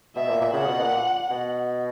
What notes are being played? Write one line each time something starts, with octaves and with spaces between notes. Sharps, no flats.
B2 E5
A#2
A#2
C#3 F#5
B2
A#2
B2